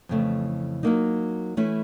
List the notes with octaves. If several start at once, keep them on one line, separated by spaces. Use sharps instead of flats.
F2 C#3 E3 A3
F#3 A#3 D#4
E3 A3 C#4 E4